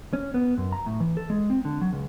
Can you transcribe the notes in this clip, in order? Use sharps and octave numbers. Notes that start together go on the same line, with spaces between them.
C#4
B3
F#2
A#5
A2
E3
A4
G#3
C4
D3
F#3
C#2